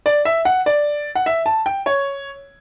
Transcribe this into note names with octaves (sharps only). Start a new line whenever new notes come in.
D5
E5
F#5
D5
F#5
E5
A5
G5
C#5